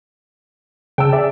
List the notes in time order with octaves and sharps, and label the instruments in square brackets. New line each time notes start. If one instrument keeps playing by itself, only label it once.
[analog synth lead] C#3 [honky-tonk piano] G5 A5 E6
[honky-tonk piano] G#4 E5 [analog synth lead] D5